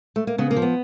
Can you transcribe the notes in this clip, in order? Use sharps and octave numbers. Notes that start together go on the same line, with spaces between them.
A3
A#3
C#3 B3
A#3
F3
B3